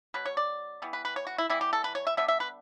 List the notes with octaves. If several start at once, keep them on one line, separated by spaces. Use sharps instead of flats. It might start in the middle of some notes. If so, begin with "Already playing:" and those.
B2 F#3 B4
C#5
D5
E3 G3 B3
B4
B4
C#5
F#4
E4
E3 G3 B3 E4
G4
A4
B4
C#5
E5
D3 G3 B3 E5
E5
B4